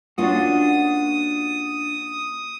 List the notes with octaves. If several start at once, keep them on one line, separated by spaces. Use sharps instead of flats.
A#3 C#4 D4 F4 F#4 D#6